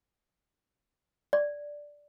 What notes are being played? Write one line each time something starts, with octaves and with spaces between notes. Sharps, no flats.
D5